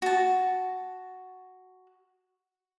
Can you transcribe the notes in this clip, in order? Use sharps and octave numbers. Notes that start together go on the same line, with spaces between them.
F#4 A5